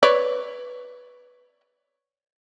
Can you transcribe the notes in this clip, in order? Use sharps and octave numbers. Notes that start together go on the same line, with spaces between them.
B4 C#5 D5